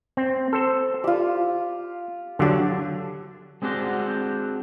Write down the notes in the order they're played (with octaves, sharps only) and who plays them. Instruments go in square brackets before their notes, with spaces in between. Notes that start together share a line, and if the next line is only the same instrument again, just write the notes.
[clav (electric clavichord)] C4
A4 C5
[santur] F4 G4 [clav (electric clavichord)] D5
[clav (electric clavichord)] D3 F#3 D4 [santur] G4 A5
[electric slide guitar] G#3 C4 D4 F#4 G4